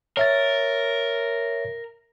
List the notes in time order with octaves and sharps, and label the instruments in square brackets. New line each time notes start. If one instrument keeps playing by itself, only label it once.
[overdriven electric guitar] A#4 [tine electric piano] C#5 E5 A6